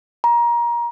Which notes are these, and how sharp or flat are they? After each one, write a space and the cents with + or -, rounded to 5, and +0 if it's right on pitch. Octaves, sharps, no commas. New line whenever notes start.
A#5 +25